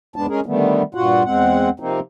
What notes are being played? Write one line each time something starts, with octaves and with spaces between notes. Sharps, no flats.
E2 G#2 G#3 B3 D4 A5
G#3 C#4 G#4 A#4
D3 D#3 G3 A3 B3
G2 A#2 F4 F#4 F#5
E2 G#3 C4 F#5
C3 F3 A#3 C4 D#4